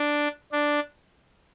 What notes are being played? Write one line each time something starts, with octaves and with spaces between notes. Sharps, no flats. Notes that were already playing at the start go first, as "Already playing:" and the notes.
Already playing: D4
D4